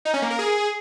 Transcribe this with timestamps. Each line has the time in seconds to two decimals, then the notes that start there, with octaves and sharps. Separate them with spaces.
0.05 D#4
0.14 C#4
0.22 A#3
0.30 A#4
0.39 G#4